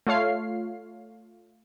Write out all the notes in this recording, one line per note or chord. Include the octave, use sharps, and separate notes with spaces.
A3 F4 C#5 F5 C7